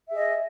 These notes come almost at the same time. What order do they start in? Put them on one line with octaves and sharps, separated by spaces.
E5 G#4 D#5